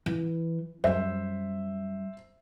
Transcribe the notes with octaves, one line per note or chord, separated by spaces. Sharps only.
E3
F#2 G3 C5 E5